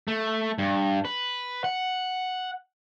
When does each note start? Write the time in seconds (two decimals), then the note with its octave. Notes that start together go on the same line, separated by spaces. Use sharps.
0.08 A3
0.58 G2
1.05 B4
1.64 F#5